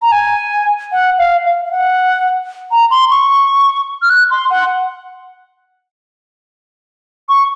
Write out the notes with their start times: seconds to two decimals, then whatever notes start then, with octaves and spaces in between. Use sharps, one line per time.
0.02 A#5
0.12 G#5
0.92 F#5
1.18 F5
1.45 F5
1.65 F5
1.71 F#5
2.71 A#5
2.91 C6
3.11 C#6
4.02 F6
4.10 F#6
4.31 C6
4.50 F#5
7.29 C#6